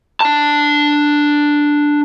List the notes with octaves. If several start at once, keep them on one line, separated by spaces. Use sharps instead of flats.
D4 A5